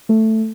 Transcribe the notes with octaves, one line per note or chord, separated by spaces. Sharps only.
A3